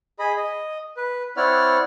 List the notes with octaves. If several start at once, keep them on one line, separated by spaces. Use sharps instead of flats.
G#4 D#5 B5
D#5
B4
C4 E4 C#5 D5 F#5 F6